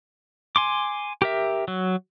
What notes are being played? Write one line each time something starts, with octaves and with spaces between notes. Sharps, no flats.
G#5 C6 D6
G4 A#4 E5
F#3